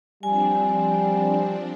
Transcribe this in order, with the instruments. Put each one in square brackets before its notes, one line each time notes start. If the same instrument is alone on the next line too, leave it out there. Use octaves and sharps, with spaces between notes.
[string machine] F3 C4 D4 [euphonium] G3 [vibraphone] G#5